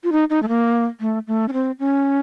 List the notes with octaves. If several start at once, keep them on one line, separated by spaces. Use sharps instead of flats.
F4
D#4
D#4
A3
A#3
A3
A3
C#4
C4
C#4